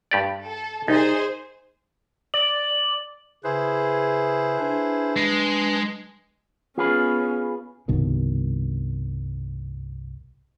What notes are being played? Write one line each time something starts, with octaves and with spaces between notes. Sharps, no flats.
G2 G4 D5
A4
C2 D#4 G#4 C5
D5 F#7
C#3 E4 G#4 B4 C5
D4 B4
G#3
B3 C#4 F4 G#4 B4
C2 G2 B2 D#3